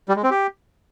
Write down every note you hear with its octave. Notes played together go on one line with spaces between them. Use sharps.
G3
G#3
C4
G4